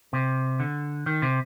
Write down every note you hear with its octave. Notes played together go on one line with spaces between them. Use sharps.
C3
D3
D#3
C3